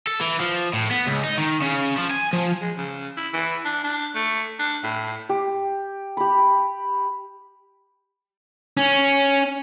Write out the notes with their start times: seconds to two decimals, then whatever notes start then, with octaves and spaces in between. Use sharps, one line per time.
0.07 A4
0.21 E3
0.41 F3
0.74 A2
0.91 B3
1.07 C#2
1.24 D#4
1.38 D#3
1.62 C#3
1.98 F3
2.11 G#5
2.33 F3
2.61 G#3
2.77 C#3
3.17 E4
3.34 E3
3.65 D4
3.84 D4
4.15 A3
4.59 D4
4.84 A2
5.29 G4
6.17 G4 B5
8.77 C#4